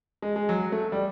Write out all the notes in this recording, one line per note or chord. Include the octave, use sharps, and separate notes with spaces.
G#3
G#3
F#3
A3
G3